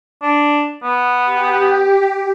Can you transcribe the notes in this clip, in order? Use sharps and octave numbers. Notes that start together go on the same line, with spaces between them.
D4
B3
G4